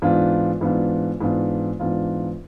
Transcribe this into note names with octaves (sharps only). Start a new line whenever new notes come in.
G#2 E3 B3 D4 F4
G#2 E3 B3 D4 F4
G#2 E3 B3 D4 F4
G#2 E3 B3 D4 F4